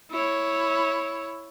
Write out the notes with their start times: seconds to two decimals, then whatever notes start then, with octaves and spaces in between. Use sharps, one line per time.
0.11 E4 C#5